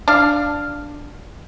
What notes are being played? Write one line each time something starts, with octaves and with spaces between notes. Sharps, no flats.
D4 F5